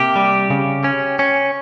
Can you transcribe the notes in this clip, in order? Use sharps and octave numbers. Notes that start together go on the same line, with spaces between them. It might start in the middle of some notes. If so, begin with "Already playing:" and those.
Already playing: C3 A#3 G4
G3
C#3
C#4
C#4